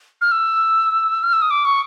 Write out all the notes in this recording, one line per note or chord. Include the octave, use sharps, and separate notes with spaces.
F6
E6
F6
E6
D#6
D6
C#6